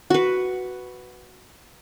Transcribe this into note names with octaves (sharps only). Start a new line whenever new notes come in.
F#4 B4